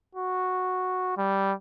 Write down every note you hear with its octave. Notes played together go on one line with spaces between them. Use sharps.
F#4
G3